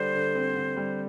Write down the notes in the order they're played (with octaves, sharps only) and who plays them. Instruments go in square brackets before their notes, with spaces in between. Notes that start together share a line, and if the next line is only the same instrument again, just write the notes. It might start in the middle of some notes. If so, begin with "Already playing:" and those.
Already playing: [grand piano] D3 G3 [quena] C5
[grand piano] D3
C4
D3
G3